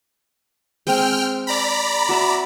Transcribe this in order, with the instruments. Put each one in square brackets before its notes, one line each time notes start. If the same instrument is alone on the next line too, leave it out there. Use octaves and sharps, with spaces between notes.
[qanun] G#3 C4 [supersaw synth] G5 F6
[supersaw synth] D5 A#5 B5
[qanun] F#4 E5